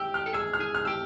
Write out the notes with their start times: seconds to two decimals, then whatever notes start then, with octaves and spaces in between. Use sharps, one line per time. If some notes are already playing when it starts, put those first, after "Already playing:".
Already playing: G4 E6
0.14 F6
0.26 A4
0.33 G#4 E6
0.53 F6
0.60 G#4
0.75 F6
0.85 G4 E6